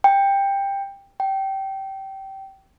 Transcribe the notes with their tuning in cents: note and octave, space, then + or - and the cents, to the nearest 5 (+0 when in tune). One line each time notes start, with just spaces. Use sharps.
G5 +15
G5 -20